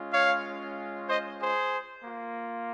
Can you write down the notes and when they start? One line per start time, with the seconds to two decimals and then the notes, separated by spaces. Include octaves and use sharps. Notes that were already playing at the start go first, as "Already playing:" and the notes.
Already playing: G#3 C#4 F4
0.13 C#5 F5
1.09 C5 D#5
1.40 G#4 C5
2.04 A#3 F4